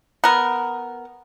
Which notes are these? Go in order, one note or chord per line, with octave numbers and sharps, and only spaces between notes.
B3 A#4